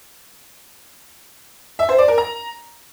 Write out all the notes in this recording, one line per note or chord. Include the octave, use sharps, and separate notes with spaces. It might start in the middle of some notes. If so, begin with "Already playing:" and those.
E5
C5
D5
A#4
A#5